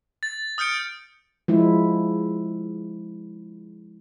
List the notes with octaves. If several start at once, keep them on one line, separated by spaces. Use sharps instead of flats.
A6
D#6 F6 G6 C#7 D7
F3 G#3 E4